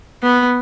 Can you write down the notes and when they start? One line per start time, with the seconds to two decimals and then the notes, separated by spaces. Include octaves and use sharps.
0.23 B3